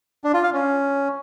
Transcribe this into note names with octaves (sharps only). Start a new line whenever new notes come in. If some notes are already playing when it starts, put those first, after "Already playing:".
D4
F4
F5
C#4